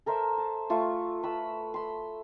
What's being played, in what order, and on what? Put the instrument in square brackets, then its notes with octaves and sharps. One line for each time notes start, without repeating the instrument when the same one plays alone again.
[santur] A4 A#4 C5 E5
A5
A3 F4 C#6
B4 B5 E6
B5 C6